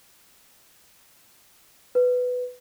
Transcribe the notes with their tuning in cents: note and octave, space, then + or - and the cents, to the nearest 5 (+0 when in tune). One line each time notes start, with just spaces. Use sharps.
B4 +10